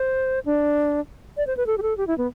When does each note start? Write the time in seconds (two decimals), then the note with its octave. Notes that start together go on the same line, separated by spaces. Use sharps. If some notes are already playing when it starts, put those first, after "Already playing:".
Already playing: C5
0.46 D4
1.37 D5
1.47 C5
1.57 B4
1.67 A4
1.78 G4
1.82 A4
1.97 G4
2.07 E4
2.18 B3